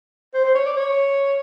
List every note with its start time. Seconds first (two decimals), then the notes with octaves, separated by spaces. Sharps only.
0.34 C5
0.44 C5
0.55 C#5
0.66 D5
0.76 C#5